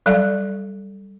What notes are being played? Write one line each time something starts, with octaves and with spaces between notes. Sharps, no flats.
F#3 G3 A4 D5 F5